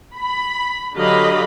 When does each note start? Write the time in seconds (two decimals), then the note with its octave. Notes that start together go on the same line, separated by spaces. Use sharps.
0.17 B5
0.97 D3 F#3 G4 D#5 F5 B5